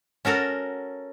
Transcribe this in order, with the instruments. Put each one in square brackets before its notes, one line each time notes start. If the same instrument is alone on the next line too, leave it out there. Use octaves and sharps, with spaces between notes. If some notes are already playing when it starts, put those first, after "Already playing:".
[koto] C#4 F#4 A4 A#4